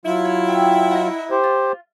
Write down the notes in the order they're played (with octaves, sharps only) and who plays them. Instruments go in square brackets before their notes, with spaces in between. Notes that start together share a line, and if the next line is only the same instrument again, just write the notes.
[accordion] F#3 F4 [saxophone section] E4
[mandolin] C#5
C#5 E5 G5
A#4 D#5 F#5
[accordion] G4 C5
[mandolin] F4